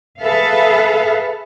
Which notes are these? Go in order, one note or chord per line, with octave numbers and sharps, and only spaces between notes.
G#4 A4 B4 E5 F5